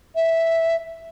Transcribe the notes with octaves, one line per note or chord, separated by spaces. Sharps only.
E5